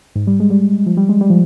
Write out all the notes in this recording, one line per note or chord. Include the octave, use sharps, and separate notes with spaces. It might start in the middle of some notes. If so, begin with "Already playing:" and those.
G#2
G3
G#3
G3
F3
G3
G#3
G3
F3